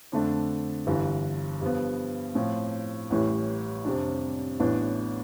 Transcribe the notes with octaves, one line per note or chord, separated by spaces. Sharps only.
F2 D3 A3 D4
G1 G2 E3
G2 F3 B3
A2 F3 C4
A1 A2 E3 G3
F2 C3 G3 D4
A1 A2 E3 B3 D4